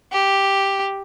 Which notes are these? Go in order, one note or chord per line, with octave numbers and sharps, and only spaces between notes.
G4